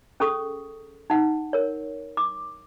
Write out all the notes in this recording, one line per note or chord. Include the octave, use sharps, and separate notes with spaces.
C#4 G#4 A4 C#6 D#6
D#4 F#5
A#4 C#5
D6